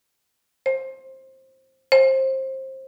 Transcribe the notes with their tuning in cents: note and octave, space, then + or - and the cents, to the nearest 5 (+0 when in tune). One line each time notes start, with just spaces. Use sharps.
C5 +15
C5 +20